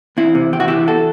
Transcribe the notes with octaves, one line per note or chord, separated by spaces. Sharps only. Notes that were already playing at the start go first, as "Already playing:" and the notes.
E2 C4 E4
C3
E2 G4
F#4
E3 E4 G4
F#4 A4